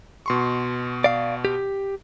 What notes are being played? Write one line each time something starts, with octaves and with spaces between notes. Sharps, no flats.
B2 C6 C#6
D5 F5
G4